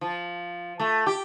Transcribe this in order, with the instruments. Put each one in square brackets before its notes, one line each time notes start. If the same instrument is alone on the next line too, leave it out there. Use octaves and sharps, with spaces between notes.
[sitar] F3
A3
G4